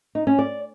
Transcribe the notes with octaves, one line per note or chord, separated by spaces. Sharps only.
D#4
C#4
D5